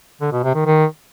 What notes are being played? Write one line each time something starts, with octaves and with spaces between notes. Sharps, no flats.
D3
B2
C3
D#3
D#3